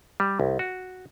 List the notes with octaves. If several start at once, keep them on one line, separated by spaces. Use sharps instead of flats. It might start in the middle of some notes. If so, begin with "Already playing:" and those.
G3
C2
F#4